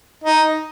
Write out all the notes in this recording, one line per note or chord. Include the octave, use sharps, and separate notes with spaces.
D#4